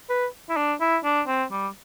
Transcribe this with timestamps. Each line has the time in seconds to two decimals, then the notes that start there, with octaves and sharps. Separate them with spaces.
0.10 B4
0.49 E4
0.57 D4
0.80 E4
1.04 D4
1.28 C4
1.51 G3